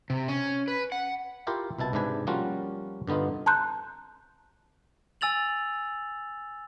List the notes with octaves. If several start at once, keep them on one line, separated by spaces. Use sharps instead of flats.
C3
C#4
B4
F#5
E4 F4 G4 A#4 F5
C2 B2 E4 A5
G#2 C3 D4 B4 G#5
F3 G3 A#3 C#4 F4 F#4
G2 D3 B3 D#4 F4
A5 A#5 C6 F#6 G6
G#5 E6 A6 F7 F#7